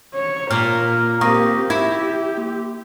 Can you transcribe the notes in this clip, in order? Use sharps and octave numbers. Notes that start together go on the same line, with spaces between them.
C#5
A#2 A#3 A#4 F6
A#3 C4 G4 C#6 D#6 A#6
E4 G4 G#6
A#3